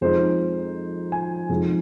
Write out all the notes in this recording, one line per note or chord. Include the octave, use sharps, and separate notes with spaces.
F2 F3 G#3 D#4 C5
G#5
F2 F3 G#3 D#4